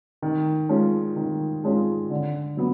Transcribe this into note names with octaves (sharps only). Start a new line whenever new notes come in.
D#3
G#3 C#4 F4
D#3
G#3 C#4 F4
D3
F#3 B3